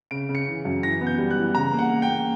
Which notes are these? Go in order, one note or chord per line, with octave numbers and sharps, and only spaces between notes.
C#3 D7
C#3
C#7
E3
F#2
E3 A#6
B3
G6
G3
F#6
E3
C#3 A#5
A#3
F#5
A#3
G5
A#3